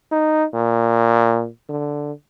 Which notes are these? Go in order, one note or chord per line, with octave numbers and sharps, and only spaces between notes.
D#4
A#2
D3